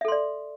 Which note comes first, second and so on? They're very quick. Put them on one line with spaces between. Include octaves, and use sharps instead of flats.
E5 A4 C6 D5